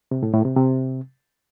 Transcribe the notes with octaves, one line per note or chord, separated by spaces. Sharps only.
C3
A2
A2
C3
C3